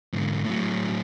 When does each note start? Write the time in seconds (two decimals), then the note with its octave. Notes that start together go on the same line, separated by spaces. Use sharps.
0.13 G#2 D3
0.45 A2 F#3